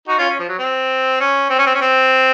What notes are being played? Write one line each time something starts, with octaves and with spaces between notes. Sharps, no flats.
D#4 F#4
C#4 F4
C#4
F3
F#3
C4
C#4
C4
C#4
C4
C#4
C4